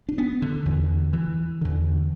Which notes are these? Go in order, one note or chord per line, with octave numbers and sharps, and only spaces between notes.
D4
B3
D3
E2 D3
E3
E2 D3